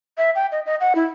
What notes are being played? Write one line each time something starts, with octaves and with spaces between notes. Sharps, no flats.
E5
G5
D#5
D#5
F#5
E4